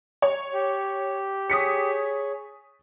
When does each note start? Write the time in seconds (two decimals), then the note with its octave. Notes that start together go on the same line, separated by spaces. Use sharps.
0.22 C#5
0.54 G4
1.50 G#4 C#5 D#6 B6 C#7